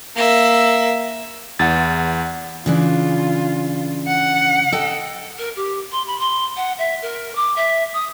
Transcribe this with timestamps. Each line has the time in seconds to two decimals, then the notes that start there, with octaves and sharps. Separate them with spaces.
0.15 A#3 E5
1.59 E2 F#5 A6
2.66 C#3 E3 D4 F4
4.08 F#5
4.72 A4 D#5 G5
5.38 A#4
5.56 G4
5.92 C6
6.07 B5
6.19 C6
6.57 F#5
6.78 E5
7.02 A#4
7.35 D6
7.56 E5
7.94 D#6